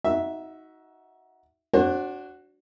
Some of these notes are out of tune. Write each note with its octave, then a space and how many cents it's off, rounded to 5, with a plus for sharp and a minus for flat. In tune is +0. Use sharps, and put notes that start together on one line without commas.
D#4 +25 F#4 +0 E5 +0
D4 -10 F#4 +5 C5 +40